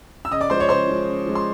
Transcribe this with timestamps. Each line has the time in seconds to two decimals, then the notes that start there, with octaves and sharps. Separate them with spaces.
0.25 E6
0.31 C#3 D#5 D#6
0.41 D5 D6
0.50 F3 G#3 C5 C6
0.60 C#5 C#6
0.69 C#3 C5 C6
0.88 F3 G#3
1.08 C#3
1.27 F3 G#3
1.35 C6